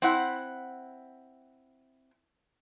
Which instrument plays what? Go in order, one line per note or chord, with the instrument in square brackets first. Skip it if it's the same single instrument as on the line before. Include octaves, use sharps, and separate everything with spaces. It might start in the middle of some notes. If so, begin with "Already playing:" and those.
[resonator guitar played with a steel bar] C4 E4 F#5